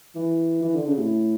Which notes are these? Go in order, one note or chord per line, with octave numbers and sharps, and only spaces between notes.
E3
E3
D3
C#3
A2